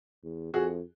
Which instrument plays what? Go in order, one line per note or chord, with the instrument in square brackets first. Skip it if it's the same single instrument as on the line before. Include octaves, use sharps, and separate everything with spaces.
[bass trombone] E2
[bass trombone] F2 [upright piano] F#4 G#4